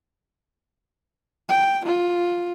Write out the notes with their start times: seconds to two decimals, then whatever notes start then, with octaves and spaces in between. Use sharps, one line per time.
1.49 G5
1.85 F4